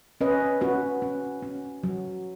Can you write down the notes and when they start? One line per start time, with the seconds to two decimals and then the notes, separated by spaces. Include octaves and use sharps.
0.21 C#4 B4 D#5
0.61 C#4 F#4 B4
1.02 C#4
1.43 C#4
1.83 F#3